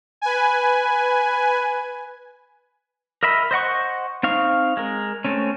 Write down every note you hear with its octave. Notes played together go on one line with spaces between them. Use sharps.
B4 G#5
A#4 D#5 E5 B5
C5 D#5 F#5 C#6
C4 D#4 F5 C#6
G#3 A#4
A3 C4 C#4